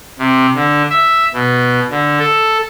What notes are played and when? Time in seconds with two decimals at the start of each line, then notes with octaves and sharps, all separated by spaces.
0.19 C3
0.55 D3
0.90 E5
1.34 B2
1.91 D3
2.19 A4